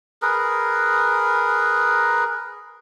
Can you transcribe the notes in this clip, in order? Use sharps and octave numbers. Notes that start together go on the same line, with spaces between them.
G#4 A#4 B4